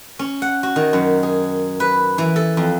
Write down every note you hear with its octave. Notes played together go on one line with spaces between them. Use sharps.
C#4
F#5
F#4
D#3
F#2
G#4
B4
E3
A4
F2